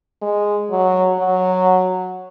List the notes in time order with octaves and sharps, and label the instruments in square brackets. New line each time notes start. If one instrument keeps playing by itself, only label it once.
[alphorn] G#3
F#3
F#3